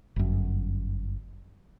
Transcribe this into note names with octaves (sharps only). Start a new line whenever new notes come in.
G1 F#2